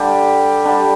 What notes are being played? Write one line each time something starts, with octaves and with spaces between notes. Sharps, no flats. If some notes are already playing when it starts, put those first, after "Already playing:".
Already playing: D3 G3 G4
D3 G3